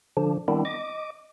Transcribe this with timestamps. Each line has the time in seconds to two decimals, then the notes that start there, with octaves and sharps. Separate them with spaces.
0.17 D3 F3 D4
0.48 D#3 G3 B3 C4 D4 E4
0.65 D#5 D6